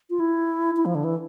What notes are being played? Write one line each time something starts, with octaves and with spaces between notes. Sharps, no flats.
F4
E4
E4
F3
D3
E3